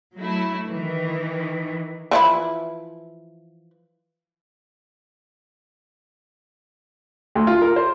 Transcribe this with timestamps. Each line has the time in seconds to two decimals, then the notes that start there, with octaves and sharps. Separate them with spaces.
0.17 F#3 A3 E4
0.67 D#3 E3
2.11 E3 F3 E4
7.35 D2
7.47 F4
7.62 A#4
7.76 C5